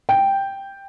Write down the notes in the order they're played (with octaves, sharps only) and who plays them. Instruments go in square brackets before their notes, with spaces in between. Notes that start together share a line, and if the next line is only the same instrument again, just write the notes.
[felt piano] G5